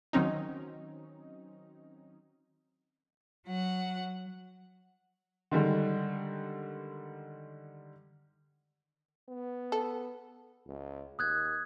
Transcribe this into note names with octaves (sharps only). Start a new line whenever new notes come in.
D#3 F#3 C4 C#4 D#4
F#3 F#5
D3 D#3 G3 G#3
B3
A4
C#2
D#2 D#6 F#6 G#6